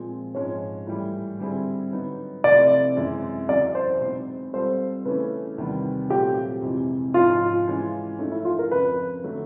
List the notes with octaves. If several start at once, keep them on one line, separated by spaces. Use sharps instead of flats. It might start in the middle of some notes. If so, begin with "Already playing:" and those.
Already playing: A#2 F3 G#3 C4
G#2 F3 G#3 C#4 C#5
A2 E3 G3
D3 G3 C4 E4 G#4
D3 F#3 B3 D#4
C3 F3 A3 C4 E4 D5
F#2 C#3 E3 G#3 C4
E2 C#3 F#3 D5
C5
B2 G#3 C4 D#4
G3 C4 F4 A4 C5
C#3 E3 A3 C#4 B4
E2 C3 D#3 G3 B3
A#2 F#3 A3 C4 F4 G4
F2 C3 E3 G#3
G#2 F3 G#3 C#4 F4
E3 G#3 C#4 F4
F3 A3 C#4 D#4
E4
F4
A#4
F2 C#3 F3 B4
D3 F#3 A3